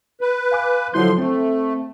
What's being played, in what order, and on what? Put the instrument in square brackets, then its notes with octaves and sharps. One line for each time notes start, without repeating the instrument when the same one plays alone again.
[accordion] B4
[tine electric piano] F5 G#5 D6
[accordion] D3 F3 C6 [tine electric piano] F#3 E4 G6
[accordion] A3 [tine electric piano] C4